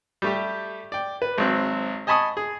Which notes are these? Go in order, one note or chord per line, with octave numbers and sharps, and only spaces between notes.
G3 A3 G4
D5 G5
B4
G#1 F#3 C4
D#5 G#5 A5 B5 C#6 D#6
G#4